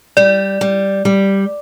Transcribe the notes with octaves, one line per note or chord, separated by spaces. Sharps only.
G3 D5
G3
G3